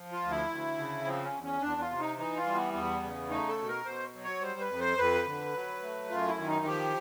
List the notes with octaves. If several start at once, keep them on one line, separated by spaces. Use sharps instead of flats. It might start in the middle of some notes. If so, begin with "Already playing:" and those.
Already playing: F3
F4
D2
E4
D2
C#3
F3 C4
C#4
E2
C#4
E2 D4
F4
C3
D#4
E3 D#4
F4
G3
B3
E2 B3
C#3
A3 D#4
A4
B2
A#4
B2 C5
F#3
C#5
G3 C5
B4
F2
C5
F2 B4
D3
F#3
A3
F#2 F4
E4
D#3
D#4
F3 G4